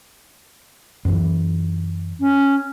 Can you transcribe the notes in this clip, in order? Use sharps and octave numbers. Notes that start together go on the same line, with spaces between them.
F#2 E3
C#4